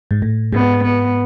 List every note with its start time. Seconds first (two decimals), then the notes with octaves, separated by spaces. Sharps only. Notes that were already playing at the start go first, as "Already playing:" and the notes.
0.11 G#2
0.22 A2
0.53 G#2 B3
0.83 B3